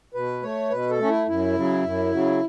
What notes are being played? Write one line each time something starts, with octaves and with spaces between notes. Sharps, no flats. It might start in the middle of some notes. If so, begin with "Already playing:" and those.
B2 B4
A3 C#5
B2 B4
A4
A3 C#4
E4
F#2 E4
C#3 F#3
F#2
C#3 F#3